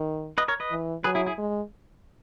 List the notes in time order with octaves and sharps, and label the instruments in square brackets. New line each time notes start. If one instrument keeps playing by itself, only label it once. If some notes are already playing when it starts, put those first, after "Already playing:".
Already playing: [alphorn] D#3
[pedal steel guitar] B4 D#5
A#4 C#5
B4 D#5
[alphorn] E3
[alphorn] F#3 [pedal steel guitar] G#4 B4
[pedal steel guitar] E4 G#4
E4 G#4
[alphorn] G#3